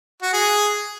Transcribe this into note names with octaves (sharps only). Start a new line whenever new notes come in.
F#4
G#4